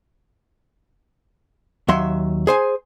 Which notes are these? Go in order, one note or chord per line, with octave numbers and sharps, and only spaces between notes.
D#2 F#3 E5 C6
G#4 C5 G#5